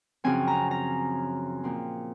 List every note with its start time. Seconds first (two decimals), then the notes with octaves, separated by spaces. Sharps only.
0.24 F#2 C#3 F3 C4 G#5
0.47 A#5
0.71 A#5
1.64 A#2 F3 C4